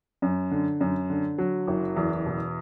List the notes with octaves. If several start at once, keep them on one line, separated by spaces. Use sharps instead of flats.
F#2
D3
F#2
D3
F#3
F#1
E2
B2